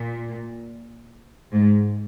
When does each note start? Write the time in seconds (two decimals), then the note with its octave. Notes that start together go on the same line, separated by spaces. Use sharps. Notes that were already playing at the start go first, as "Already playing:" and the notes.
Already playing: A#2
1.53 G#2